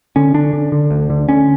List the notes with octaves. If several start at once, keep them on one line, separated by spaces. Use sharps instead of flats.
D3 C#4
D3 D4
D3
D3
D2
D3
D3 C#4